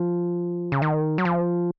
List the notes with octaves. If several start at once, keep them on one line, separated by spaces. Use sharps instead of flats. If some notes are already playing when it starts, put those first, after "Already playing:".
Already playing: F3
C#3
D#3
F#3
F3